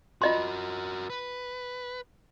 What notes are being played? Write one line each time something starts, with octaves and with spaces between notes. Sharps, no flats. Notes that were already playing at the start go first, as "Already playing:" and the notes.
F4 F#4 A#4 D#5 C6
B4